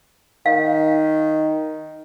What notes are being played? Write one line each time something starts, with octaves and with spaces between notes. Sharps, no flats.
D#3 F5